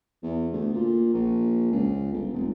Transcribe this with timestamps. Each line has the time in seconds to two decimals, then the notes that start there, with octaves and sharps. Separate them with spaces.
0.23 E2
0.53 D2
0.73 A#2
1.13 A#1
1.72 C#2
2.12 G1
2.33 F1